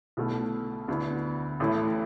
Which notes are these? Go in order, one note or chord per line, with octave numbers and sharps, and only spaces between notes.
B1 B2 A3 E4
D2 D3 B3 E4
A1 A2 A3 E4